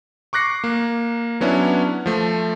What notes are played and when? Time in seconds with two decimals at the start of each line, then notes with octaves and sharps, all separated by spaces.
0.33 C#6 D6 F#6 A#6 C7 C#7
0.64 A#3
1.40 F#3 B3 C#4 D4 E4
2.06 F3 A3